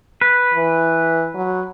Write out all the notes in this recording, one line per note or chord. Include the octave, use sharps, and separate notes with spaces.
B4
E3
F#3